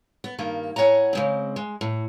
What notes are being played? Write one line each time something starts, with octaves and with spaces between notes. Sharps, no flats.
B3
G2 D#3 A#3
A2 C#5 F#5 G#5 A#5
C#3 G#3 C4
G#3
A2